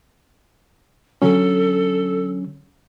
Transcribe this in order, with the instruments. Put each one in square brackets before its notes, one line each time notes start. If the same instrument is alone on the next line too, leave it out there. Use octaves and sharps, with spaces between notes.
[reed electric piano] D3 F#3 C#4 [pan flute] A4